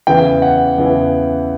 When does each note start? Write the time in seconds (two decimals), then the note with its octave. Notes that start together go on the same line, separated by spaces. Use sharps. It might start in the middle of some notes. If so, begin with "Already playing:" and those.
0.07 E2 C#3 E3 G5
0.42 F#5
0.78 E2 C#3 E3